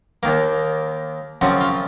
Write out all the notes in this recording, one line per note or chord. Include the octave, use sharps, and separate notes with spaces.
D#2 D#3 A#3
F#2 C#3 F3 C4 F#4
F4